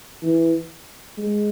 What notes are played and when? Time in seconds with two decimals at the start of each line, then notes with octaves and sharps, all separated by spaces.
0.22 E3
1.18 G#3